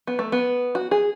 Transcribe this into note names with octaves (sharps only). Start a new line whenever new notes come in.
B3
A3
B3
F#4
G#4